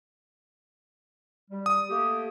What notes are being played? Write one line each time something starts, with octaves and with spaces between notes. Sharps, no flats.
G3
D#6
A3 A#3 G4